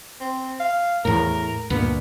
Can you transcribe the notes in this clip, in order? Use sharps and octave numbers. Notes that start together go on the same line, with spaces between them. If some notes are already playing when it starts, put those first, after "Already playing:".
C4
F5
E2 A2 A#4
D2 G2 A#2 B3